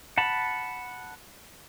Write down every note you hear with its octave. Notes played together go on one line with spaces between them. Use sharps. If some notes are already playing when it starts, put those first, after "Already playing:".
F#5 A5 B5